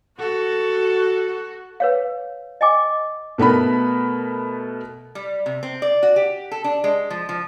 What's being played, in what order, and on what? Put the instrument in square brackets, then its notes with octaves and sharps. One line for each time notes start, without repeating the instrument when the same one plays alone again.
[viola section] F#4 [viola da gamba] A4
[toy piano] B4 C#5 F5
D#5 G5 G#5 D6
[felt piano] B2 A3 B3 A#4 B5
[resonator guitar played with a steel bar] G3
C3
C4
D5
F#4
G4
A4
D4
G#3
F3
F3